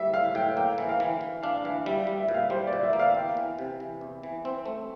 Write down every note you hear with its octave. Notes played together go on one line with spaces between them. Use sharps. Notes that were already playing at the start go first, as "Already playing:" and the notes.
Already playing: G3 E5
A2 F5
A2 G5
A#3 G5
E3
F5
E3
E3
D4 F5
E3 F5
G3 E5
G3
E5
A#2
F5
G3 C5
D5
A#2
E5
A#3
F5
E2 G5
E3
C3
E3
E2
E3
C4
A3